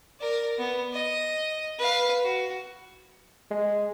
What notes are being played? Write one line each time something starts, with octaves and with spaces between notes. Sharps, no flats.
A#4 D5
B3
D#5
B4 F5
F#4
G#3